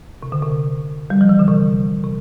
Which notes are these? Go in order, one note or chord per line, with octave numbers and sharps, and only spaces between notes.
C3
D3
C3
G3
F3
E3
D3
C3
C3